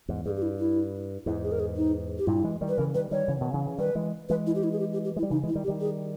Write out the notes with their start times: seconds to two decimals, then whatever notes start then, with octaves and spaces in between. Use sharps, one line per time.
0.08 E2 G#2
0.26 G2 G#4
0.36 G4
0.42 E4
0.59 E4
1.26 E2 G#2 E4
1.44 G#4
1.52 A#4
1.60 G#4
1.77 D#4
2.18 G4
2.27 G2 A#2 E4
2.44 E3 G#3
2.61 D#3 G3
2.69 B4
2.78 C#3 E3 A#4
2.94 D#3 G3 B4
3.11 D#3 G3 C#5
3.28 C#3 E3
3.41 B2 D#3
3.53 C#3 E3
3.66 C#3 E3
3.78 D#3 G3 B4
3.95 E3 G#3
4.29 E3 G#3 B4
4.47 E4
4.55 G4
4.64 E4
4.72 G#4
4.79 G4
4.93 G4
5.05 G4
5.16 G#3 E4
5.23 G3
5.30 C#3 E3 D#4
5.43 E3 G#3 E4
5.55 D#3 G3
5.64 G4
5.68 D#3 G3
5.81 G#4